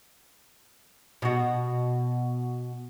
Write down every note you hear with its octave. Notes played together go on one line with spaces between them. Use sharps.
B2 F#4